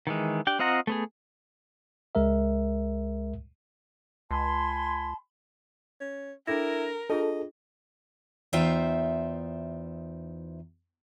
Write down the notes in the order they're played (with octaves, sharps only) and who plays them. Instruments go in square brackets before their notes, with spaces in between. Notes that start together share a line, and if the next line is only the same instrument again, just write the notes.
[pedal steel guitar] D#3 E3 G#3
D4 G4 G5
C4 F4 D#5 F#5 A#5
A3 B3 G#4
[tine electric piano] C#2 G#3 A#4 E5
[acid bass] C#2 [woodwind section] G#5 B5 C6 [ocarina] A5
[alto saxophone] C#4
[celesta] D4 A4 A#6 [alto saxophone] E4 [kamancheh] A#4
[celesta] D4 F4 G#4 [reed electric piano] A4 [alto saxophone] D#5
[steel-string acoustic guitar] E2 D#4 F4 C5 E5 G5